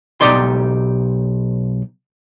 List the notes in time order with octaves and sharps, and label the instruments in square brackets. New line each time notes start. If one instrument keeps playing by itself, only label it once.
[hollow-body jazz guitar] B1 D#4 G4 D5 C6